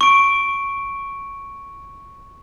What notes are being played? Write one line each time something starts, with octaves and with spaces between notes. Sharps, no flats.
C#6 D7